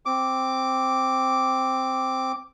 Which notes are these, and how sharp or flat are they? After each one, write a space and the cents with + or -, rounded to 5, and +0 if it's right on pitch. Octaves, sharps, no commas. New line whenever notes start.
C4 +0 D6 +0